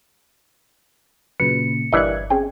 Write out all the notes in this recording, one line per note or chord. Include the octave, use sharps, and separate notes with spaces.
A#2 C#3 F#3 B4 C#7
G1 G2 E3 A#4 D5 D#5 F#6 G#6
C4 C#4 G#4 G5